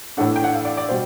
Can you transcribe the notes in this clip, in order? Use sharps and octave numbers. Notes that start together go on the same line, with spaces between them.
A2 E3 A3 D4 F#5
G5
F#5
F5
D5
D5
B2 G3 C5